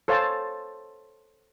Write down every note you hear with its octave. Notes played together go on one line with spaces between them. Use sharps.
A4 C5 C#5 F5 G#5 A5